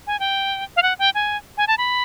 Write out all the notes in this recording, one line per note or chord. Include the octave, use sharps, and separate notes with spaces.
G#5
G5
F5
F#5
G5
G#5
G#5
A5
B5